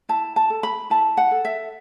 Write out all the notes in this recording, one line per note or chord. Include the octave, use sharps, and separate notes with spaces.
E4 A5
A5
A4
B5
E4 A5
F#5
A4
E5